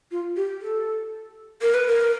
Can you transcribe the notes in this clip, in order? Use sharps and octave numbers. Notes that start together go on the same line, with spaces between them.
F4
G4
A4
A#4
B4
A#4